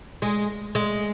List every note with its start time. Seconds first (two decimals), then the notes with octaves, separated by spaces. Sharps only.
0.22 G#3
0.75 G#3